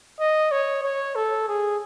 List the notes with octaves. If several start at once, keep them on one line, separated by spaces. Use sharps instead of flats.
D#5
C#5
C#5
A4
G#4